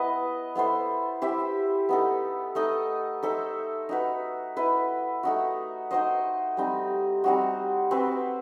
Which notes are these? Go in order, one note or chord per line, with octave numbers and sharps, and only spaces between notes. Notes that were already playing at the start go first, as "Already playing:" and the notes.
Already playing: B3 E4 B4 D#5
B3 E4 A4 C5
E4 G4 C5 E5
B3 D#4 A4
A3 D#4 A4 D#5
D#4 A4 C5 E5
D#4 F#4 B4
E4 B4 D#5
A3 D#4 F#4
D#4 F#4 C5 D#5
G3 C4 D#4
G3 C4 D#4 F#4
C4 F#4 B4